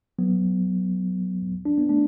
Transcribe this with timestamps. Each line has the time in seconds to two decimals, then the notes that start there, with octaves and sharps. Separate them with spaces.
0.19 F#3 B3
1.65 D4
1.78 B3
1.89 A3 D4